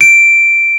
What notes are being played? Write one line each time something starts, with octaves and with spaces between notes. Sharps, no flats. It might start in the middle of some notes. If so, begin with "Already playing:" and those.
D7